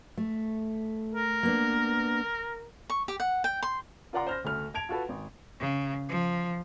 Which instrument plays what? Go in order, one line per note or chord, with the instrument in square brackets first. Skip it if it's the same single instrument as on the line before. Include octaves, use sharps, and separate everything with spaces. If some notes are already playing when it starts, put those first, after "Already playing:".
[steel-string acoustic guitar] A3
[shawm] A#4
[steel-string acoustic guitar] A#3 B3 D4
[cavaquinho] C#6
G4
F#5
G5
C6
[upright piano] F4 A#4 D5 F#5 A#5 C6
C5 F6 A#6
D2 A3 F6
A5 G#6 D7 F7
F4 F#4 A4 B4
G#1
[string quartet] C#3
F3